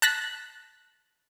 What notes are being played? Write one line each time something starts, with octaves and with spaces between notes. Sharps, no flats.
A5 F#6 A#6 B6